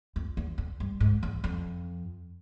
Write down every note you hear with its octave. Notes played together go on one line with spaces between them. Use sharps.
F2
E2
F2
G2
G#2
E2
F2